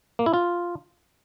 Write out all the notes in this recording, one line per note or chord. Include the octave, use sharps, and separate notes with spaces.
A#3
E4
F4